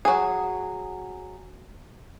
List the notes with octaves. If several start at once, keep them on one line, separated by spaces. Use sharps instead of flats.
F#3 G#4